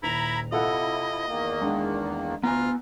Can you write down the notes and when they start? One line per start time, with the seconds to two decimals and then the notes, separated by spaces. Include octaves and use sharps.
0.03 D#1 E4 A#5 B5 F7
0.52 C3 E4 F4 A4 D#5 F#5
1.28 E2 D#3 A#3
1.61 G#3 D4
2.43 D2 B3 F4 G#5 A#5